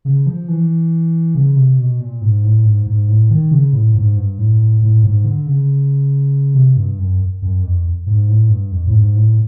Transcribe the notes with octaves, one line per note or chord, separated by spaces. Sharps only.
C#3
F3
E3
C#3
C3
B2
A#2
G#2
A2
G#2
G#2
A2
D#3
C#3
A2
G#2
G2
A2
A2
G#2
D3
C#3
C3
G2
F#2
F#2
F2
G#2
A2
G2
F2
A2
G#2
A2